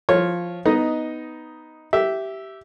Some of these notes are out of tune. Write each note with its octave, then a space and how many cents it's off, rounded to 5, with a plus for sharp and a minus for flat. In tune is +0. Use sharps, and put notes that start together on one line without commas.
F3 +0 F4 +0 C#5 -15
B3 +5 D#4 +5 D#5 +0
G4 -15 E5 +0